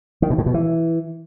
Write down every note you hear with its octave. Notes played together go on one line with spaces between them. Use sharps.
D#3
B2
A2
B2
E3